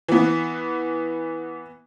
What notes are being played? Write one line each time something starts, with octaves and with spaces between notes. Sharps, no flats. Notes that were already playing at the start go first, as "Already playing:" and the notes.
E3 B3